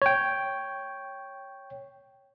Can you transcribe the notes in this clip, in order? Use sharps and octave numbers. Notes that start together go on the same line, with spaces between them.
C#5 G5